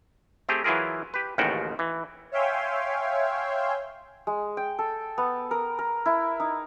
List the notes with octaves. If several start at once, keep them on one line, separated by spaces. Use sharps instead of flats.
A3 C4 G4 G#4
E3 F#3 E4 F4 G#4 A#4
G4 B4
A1 D#2 C#3 F3 F#4 G5
E3
C#5 E5 F5 G5 G#5 C6
G#3
G5
A4
B3
A#4
A#4
E4
D#4